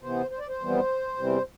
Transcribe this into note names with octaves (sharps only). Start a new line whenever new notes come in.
C3 E3 B3 C5
C5
D5
C5
F2 E3 G3 B3
E2 C3 E3 G3 C4